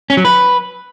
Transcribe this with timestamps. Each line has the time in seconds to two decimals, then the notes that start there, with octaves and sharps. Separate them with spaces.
0.10 C#4
0.17 F#3
0.25 B4